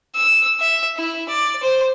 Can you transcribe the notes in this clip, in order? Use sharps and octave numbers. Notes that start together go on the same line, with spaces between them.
E6
E5
E4
D5
C5